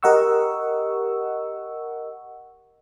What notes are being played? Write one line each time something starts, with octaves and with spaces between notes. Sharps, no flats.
G4 A#4 D#5 F#5 C#6 E6